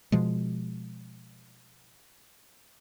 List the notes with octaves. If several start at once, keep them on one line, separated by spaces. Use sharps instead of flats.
B2 F3 G#3